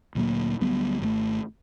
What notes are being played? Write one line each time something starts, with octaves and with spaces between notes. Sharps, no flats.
D2 A#2 F#3 A#3
D2 F#3 G3 B3
G#1 B2 A3